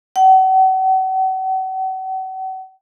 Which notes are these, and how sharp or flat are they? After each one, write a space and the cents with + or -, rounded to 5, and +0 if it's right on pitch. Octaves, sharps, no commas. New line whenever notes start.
F#5 +40